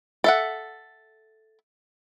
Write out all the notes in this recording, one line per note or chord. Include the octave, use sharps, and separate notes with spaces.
A4 E5 F#5